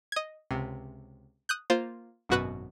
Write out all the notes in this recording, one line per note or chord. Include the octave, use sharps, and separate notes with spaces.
D#5 G#6
C#2 C3
D#6 F#6 G6
A#3 F4 C5
G#1 F#2 B2 F#4 B4 F#6